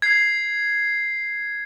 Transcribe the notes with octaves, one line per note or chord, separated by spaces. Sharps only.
G#6 C7